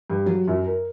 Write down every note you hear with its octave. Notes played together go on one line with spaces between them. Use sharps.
G2
F#3
F#2
A#4